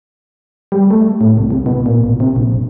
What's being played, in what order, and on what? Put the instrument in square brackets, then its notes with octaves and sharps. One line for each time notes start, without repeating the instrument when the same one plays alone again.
[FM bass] G3
A3
A2
C2
C2
B2
A#2
A1
C3
A#1
F#1